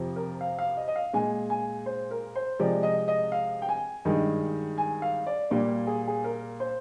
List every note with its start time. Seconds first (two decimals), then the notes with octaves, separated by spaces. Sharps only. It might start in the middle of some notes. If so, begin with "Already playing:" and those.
Already playing: F2 C3 F3
0.16 A#4
0.41 F5
0.59 F5
0.77 D#5
0.88 D#5
0.96 F5
1.13 A#2 G#3 G#5
1.50 G#5
1.86 C5
2.11 A#4
2.36 C5
2.59 C3 F3 G#3 D5
2.83 D#5
3.08 D#5
3.32 F5
3.62 G5
3.69 G#5
4.05 G2 D#3 G#3
4.78 G#5
5.02 F5
5.27 D5
5.51 A#2 G3 A#3 D5
5.87 G#4
6.08 G#4
6.24 A#4
6.60 C5